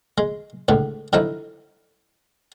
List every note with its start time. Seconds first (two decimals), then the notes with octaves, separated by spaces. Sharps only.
0.18 G#3
0.68 C#2 A2 D3
1.13 D3 F3 D#4 E4